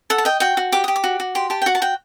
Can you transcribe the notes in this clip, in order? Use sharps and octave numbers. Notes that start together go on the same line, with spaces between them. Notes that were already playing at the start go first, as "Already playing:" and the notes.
A4 F#5
A5
D#5 G5
F#4 G5
F#4
G4 D6
G4 D#6
D6
F#4
F#4
G4 C6
G4 A5
G5
F#4 F#5
A5
F#4 G5